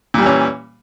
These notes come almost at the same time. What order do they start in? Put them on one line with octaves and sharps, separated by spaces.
A#2 G3 E3 C#4